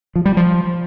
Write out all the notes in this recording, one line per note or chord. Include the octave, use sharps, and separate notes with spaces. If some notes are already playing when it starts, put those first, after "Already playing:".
F3
G3
F3